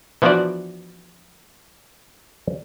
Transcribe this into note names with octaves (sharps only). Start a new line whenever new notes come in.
E3 F3 B3 D4 F#4 D5